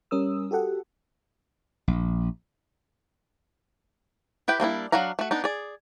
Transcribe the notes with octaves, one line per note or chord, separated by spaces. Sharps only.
G3 C#4 A#4 D#6 E6
F#4 G4 A4 F#5
A#1
E4 G4 B4 G5
G3 A#3 D4 E4
F#3 D4 F#4 F5 A#5
A3 F#4
B3 D4 D#4
G#4 D5